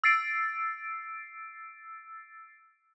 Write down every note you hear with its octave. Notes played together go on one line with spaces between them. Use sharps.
E6 A6 C7 D7